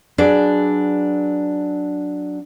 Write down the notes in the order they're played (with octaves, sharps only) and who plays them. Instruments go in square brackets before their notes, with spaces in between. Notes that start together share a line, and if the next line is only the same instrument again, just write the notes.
[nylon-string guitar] F#3 D4 G#4 B4 D5